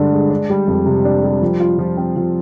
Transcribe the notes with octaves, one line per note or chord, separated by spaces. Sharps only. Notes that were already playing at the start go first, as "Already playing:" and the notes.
Already playing: G2 D3 G#3 D4
G#3
D4
G3
F2
C3
D4
G3
F3
F4
F3
C4
F3